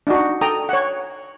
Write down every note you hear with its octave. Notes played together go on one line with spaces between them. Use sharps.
D4 D#4 F#4
A4 G5 A#5 D#6
C#5 F#5